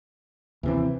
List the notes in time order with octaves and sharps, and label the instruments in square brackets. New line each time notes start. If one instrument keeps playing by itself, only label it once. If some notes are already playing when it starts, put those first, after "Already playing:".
[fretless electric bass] D#2 C3 C4 [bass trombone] E3